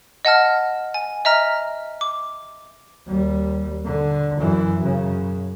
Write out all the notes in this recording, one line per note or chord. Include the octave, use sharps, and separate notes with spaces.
D#5 F#5 A5 F6
G#5
D#5 E5 A#5 F6
D6
D#2 G3
D3
F#2 E3
F#2 C#3